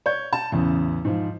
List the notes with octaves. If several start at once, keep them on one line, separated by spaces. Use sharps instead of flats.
C#5 G6
A5
A1 E2 C#3
G#2 F3